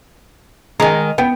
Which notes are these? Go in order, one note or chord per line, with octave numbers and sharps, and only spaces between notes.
D#3 G#3 D#5 A#5
B3 G5